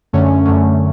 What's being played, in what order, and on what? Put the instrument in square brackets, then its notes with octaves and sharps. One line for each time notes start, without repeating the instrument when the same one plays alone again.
[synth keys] F#2 D3 A3 C#4
F#2 D3 A3 C#4